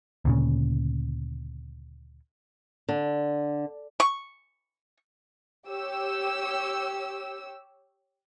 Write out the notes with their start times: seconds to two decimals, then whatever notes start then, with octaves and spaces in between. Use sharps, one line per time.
0.25 D2 A#2 C#3
2.89 D3
4.00 C#6
5.68 G4 C#5 E6